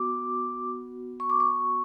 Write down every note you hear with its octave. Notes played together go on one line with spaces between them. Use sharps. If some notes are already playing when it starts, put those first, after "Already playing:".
Already playing: B3 F#4 D6
C#6
D6
C#6